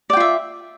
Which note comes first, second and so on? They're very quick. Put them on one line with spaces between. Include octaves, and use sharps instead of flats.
D5 G5 F4 E5